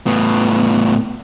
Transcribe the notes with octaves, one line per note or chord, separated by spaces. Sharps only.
A2 B3